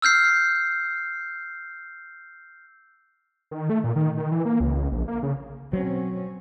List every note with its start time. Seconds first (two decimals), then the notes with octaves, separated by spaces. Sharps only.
0.02 E6 F6 G6 C7
3.51 D#3
3.70 A3
3.84 A#2
3.96 D#3
4.17 D#3
4.32 E3
4.45 A#3
4.60 C#2
4.77 C#2
4.92 A#1
5.08 A#3
5.23 C#3
5.73 B2 F#3 C4 C#4